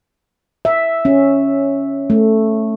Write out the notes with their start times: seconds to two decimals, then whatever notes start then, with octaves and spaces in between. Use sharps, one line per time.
0.65 E5
1.05 C#4
2.10 A3